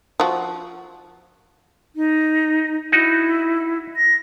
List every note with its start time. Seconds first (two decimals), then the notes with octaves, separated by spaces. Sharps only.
0.20 F3 F#4
1.96 D#4
2.92 D#4 E4 F#4
3.96 A#6